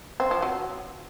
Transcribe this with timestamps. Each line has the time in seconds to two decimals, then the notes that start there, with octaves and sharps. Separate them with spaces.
0.20 C4
0.31 F3
0.42 F#3